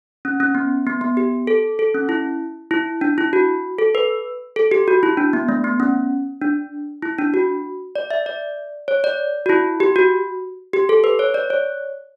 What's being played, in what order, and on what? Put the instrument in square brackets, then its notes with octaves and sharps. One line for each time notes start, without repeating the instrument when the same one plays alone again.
[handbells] C#4
C#4
B3
B3
B3
G4
A4
A4
C#4
E4
E4
D4
E4
F#4
A4
B4
A4
G4
F#4
E4
D4
B3
A3
B3
C#4
D4
E4
D4
F#4
D5
E5
D5
C#5
D5
F#4
E4
G4
F#4
G4
A4
B4
C#5
D5
C#5